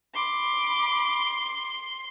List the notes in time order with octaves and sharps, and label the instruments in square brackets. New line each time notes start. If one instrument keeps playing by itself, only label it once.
[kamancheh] B5 D6 [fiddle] C6